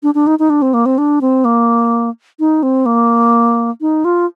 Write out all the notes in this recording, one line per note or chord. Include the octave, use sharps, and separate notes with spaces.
D4
D4
D#4
D#4
D4
C4
A#3
C4
D4
C4
A#3
D#4
C4
A#3
D#4
F4